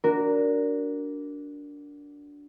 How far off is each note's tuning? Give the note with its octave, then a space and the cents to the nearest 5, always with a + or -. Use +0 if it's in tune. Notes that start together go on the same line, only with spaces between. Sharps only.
D4 -15 F#4 +0 A#4 -5